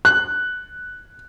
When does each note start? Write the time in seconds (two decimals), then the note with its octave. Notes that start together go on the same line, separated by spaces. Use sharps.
0.05 F#6